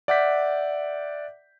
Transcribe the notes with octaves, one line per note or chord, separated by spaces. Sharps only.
D5 E5 F#5 D6 G6 B6